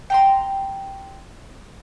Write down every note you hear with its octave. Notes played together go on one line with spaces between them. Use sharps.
G5 A#5 C6